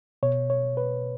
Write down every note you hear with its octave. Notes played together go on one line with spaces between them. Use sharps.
B2 C#5
C#5
B4